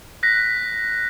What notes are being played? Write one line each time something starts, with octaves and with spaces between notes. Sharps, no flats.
F#6 A#6 B6